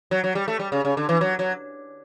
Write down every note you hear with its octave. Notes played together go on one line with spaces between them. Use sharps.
F#3
F#3
G3
A3
G3
C#3
C#3
D3
E3
F#3
F#3